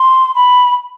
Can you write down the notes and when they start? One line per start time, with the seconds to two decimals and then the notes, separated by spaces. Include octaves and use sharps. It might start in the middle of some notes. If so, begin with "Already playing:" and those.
Already playing: C6
0.35 B5